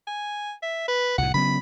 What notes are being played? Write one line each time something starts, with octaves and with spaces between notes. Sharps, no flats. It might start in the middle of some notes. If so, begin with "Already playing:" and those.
G#5
E5
B4
C2 A2 F#5
C#3 F#3 B3 B5